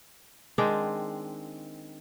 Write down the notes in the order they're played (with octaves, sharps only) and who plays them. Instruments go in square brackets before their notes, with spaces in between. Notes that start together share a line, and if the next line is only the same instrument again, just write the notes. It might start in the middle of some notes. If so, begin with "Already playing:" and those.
[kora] D#3 G#3 C4 D4